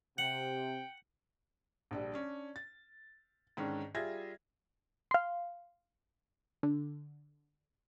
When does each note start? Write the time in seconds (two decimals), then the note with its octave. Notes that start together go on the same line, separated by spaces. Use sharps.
0.18 C3 F#5 G5
1.91 A#1 D3 G3
2.14 C#4 D4
2.56 A6
3.57 G#2 D3 D#3 C#4
3.94 G3 F4 G#4 E5 G#6 A#6
5.11 F5 C6
6.63 D3